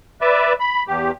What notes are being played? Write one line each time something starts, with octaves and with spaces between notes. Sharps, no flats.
B4 D5 E5
B5
E2 G4